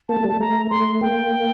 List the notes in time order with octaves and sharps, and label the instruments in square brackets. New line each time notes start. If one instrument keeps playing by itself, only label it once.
[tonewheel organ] A#3 [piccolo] A5
[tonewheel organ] A3
G3
[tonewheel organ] A3 [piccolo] A5
[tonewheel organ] A3 [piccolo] A#5
[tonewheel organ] A3 [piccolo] C6
[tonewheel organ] A#3 [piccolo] G5